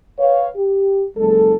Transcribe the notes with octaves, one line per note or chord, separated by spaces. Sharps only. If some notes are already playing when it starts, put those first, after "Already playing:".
B4 C#5 F5
G4
F#1 G#3 A4